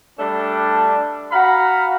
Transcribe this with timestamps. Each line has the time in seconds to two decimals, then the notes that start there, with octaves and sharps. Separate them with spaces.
0.19 G3 A3 D4
1.32 F#4 F5 F#5 A#5 B5